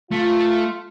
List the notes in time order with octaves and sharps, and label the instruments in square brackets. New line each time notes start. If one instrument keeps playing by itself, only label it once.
[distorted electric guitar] A3 [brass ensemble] F4